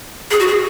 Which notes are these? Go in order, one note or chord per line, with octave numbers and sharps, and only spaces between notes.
G#4
F#4
G#4